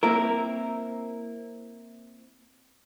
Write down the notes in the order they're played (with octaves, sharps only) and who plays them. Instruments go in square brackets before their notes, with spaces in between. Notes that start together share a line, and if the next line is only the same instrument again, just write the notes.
[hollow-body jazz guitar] A#3 C4 E4 A#4